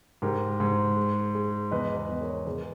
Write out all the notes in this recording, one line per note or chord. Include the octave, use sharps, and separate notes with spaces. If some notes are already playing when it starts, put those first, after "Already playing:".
G#2 G4 A#4
G#2
G#3
G#3
E2 B4 D#5
B4 D#5
E2
A#4 C#5
E2 G#4 B4